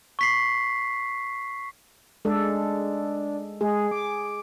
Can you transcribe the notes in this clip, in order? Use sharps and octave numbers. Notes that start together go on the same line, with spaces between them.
C#6 B6 C7
G#3 D4 A4
G#3 G#4
D6